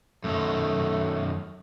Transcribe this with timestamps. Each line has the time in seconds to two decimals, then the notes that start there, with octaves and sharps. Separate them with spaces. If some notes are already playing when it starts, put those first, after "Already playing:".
0.24 F#2 D#3 A3